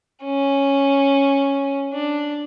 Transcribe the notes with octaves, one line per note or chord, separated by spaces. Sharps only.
C#4
D4